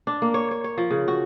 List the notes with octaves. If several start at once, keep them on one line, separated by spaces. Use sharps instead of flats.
D4
A#3
C#5
C#5
C#5
F3
C#3
F#4